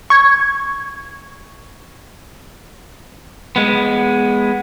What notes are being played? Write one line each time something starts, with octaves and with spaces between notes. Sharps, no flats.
C#6 G#6
G#3 B3